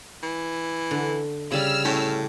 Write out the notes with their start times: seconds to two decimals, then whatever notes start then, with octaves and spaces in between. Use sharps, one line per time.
0.23 E3
0.91 D3
1.52 C#3 G3 D5 E6 F6
1.85 A2 C#4 G4